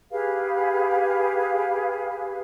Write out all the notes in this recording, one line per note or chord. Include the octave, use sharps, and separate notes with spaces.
G4 G#4 B4 F5